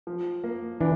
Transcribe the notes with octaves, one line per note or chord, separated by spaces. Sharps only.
F3
A#3
E3 D4